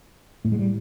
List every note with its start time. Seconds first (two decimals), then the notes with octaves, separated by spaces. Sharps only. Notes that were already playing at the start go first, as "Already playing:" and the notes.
0.45 A2 A3
0.52 G#3
0.59 G3